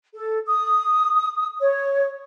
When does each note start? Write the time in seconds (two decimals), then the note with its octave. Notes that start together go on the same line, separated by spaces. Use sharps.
0.14 A4
0.46 D#6
1.60 C#5